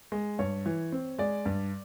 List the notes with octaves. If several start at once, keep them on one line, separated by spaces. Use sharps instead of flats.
G#3
G2 C#5
E3
C4
G#3 D5
G2